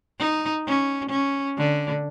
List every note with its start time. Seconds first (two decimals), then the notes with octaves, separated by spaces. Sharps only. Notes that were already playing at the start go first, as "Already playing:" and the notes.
0.19 D#4
0.67 C#4
1.10 C#4
1.58 D3